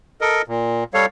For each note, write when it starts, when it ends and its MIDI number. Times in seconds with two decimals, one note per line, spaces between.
0.21 0.42 69
0.21 0.42 70
0.21 0.42 75
0.48 0.84 46
0.94 1.06 55
0.94 1.06 69
0.94 1.06 73
0.94 1.06 77